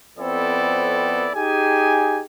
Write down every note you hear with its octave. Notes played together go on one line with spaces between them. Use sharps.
F2 B3 C4 E4 A4 D5
D#4 G4 G#4 G#5